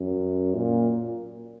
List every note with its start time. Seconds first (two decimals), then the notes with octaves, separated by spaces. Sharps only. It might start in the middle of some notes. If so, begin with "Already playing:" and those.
Already playing: F#2
0.55 A#2